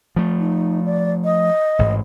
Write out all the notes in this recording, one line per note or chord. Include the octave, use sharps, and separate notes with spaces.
F3 A3
D#4
D5
D#5
A1 G#2